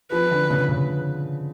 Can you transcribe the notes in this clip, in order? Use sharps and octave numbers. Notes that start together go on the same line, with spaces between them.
F3 B4
D3
C#3
C#3